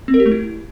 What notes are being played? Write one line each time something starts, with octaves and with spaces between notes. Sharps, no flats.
C4
A#4
G4
A3
E4